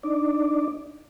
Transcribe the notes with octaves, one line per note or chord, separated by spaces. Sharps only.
D4 D#4 D5